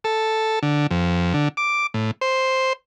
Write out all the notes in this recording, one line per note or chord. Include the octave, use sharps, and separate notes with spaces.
A4
D3
F2
D3
D6
A2
C5